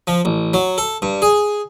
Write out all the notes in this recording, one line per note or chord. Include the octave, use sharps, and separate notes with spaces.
F3
A1
F#3
A4
G2
G#4